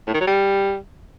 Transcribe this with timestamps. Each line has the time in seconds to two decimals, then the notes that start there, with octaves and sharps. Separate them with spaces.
0.07 A2
0.14 D#3
0.20 F#3
0.27 G3